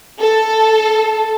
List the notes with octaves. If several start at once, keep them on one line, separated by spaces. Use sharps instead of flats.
A4